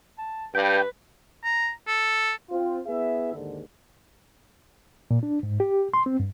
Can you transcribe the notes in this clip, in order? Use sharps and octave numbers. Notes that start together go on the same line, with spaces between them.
A5
G2 B4 G5
A#5
A4
C4 F4
B3 E4 G#4 E5
D#2 G#2 D3
A#2
D4
G#2
G4
C6
C4
G2